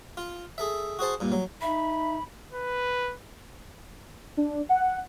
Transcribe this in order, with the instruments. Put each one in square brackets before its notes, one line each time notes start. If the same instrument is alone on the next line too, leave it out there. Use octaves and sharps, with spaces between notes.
[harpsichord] F4
G#4 A4 E5
F#4 G#4 C5 A5
G2 A#2
F#3
[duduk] D#4 [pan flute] E5 [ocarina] B5
[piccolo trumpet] B4
[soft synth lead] D4
F#5